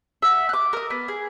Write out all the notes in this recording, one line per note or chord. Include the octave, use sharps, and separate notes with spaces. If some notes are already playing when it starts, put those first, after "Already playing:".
E5 F#5
D6 F#6
A#4 D#6
B3
G#4